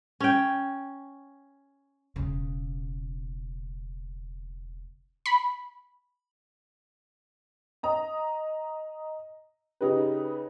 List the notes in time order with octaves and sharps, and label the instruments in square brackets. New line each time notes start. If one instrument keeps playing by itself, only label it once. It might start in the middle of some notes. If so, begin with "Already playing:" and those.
[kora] C#4 G5
[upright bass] E1 C#3
[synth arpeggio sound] B5
[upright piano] D#5 A#5 D#6
C#3 D#4 G4 B4